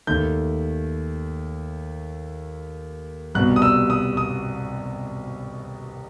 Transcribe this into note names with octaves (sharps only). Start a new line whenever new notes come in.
D#2 D#3 A3 G6
C2 B2 G3 F#6
D#6
E6
D#6
D#6